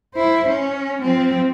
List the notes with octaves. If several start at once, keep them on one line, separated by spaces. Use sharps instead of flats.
E4 C5
C#4
F3 C4